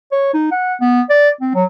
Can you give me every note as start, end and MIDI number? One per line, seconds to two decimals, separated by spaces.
0.12 0.29 73
0.34 0.51 63
0.52 0.75 78
0.81 1.01 59
1.09 1.30 74
1.41 1.53 60
1.55 1.65 54